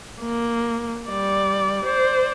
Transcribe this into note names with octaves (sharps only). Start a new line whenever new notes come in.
A#3
G3 D5
C5 D5